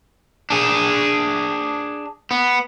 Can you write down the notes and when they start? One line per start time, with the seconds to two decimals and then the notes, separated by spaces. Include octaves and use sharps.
0.50 D4 G#4
2.31 B3